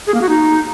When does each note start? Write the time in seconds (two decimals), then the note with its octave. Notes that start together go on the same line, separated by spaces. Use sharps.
0.07 G#4
0.14 A#3
0.22 F#4
0.29 D#4